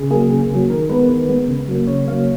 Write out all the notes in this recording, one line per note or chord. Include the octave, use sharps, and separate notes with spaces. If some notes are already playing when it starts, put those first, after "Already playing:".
Already playing: C#3 G#4
F#3 A#3 G#4
C#3 G#4
F#3 A#3
D#3 A#4
G#3 B3 B4
D#3
G#3 B3
C#3
F#3 A#3
C#3 C#5
F#3 A#3 F5